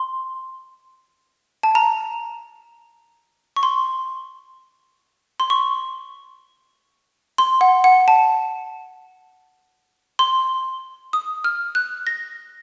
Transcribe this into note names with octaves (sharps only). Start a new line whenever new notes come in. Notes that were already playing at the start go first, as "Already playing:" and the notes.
Already playing: C6
A5
A#5
C#6
C6
C6
C#6
C6
F#5
F#5
A5
C6
D#6
F6
F#6
A#6